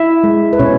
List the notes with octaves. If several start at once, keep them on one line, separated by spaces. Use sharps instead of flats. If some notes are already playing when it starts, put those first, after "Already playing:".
Already playing: E4 E5
G#3
B4
B2 C#4 C#5